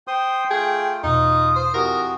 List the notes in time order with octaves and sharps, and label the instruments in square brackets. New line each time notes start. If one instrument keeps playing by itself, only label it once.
[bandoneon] C5 C6 D#6 [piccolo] G5
[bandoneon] A3 F4 [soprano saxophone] G#4
[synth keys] E2 B2 [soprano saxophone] D#4 [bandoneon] F4 [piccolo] D#6
[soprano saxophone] C5
[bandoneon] F2 F#4 [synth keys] E4 G4 G#5 [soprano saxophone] A#4